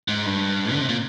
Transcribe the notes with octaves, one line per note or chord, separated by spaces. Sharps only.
G#2
G2
D3
C3
A#2